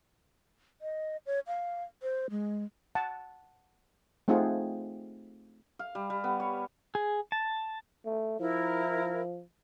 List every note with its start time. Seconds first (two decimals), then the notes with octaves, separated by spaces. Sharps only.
0.82 D#5
1.26 C#5
1.47 F5
2.02 C5
2.30 G#3
2.95 F#5 A5
4.28 A3 C4 D#4 F4 G#4 F#5
5.79 F5
5.95 G3
6.10 G3
6.24 B3
6.40 C#5
6.95 G#4
7.32 A5
8.05 A3
8.40 F3 E4 A#4